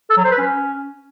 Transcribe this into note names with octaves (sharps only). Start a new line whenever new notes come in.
A4
F#3
C5
B4
C#4